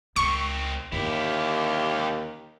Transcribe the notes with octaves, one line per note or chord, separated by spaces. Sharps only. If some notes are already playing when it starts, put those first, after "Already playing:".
C#2 D#3 C4 C#6
D#2 D3 C#4 E4 G4